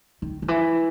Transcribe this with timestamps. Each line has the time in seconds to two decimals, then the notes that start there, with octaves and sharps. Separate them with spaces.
0.22 D#3
0.42 D#3
0.48 E3